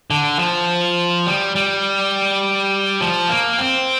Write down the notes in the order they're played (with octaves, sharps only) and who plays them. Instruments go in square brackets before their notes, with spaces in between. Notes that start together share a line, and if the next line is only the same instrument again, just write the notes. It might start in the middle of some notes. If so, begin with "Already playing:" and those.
[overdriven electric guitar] D3
F3
G3
G3
F3
A#3
C4